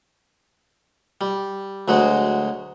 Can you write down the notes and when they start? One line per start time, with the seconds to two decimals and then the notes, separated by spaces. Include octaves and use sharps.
1.21 G3
1.88 D2 F#3 G#3 F#4